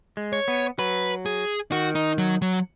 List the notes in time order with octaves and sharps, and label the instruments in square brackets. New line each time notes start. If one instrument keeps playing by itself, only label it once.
[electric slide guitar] G#3
[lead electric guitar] C#5
[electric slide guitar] B3
[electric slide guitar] F#3 [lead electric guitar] B4
[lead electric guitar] G#4
[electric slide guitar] D#3 [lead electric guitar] F#4
[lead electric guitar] D#4
F#3
F#3